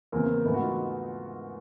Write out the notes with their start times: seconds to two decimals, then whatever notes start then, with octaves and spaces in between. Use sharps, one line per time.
0.12 E2 C#3 E3 A#3 C4
0.45 G#2 E3 A3 B3
0.54 F#4
0.61 D#4 F4